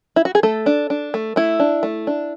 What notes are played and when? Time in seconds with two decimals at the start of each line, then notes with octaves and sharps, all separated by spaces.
0.16 E4
0.25 F#4
0.35 G#4
0.43 A3 A4
0.66 D4
0.90 D4
1.14 A3
1.36 A3 E4
1.60 D4
1.83 A3
2.07 D4